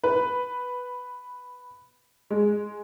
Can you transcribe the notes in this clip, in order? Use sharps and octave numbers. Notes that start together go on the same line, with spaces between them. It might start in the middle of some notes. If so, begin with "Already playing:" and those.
B4
G#3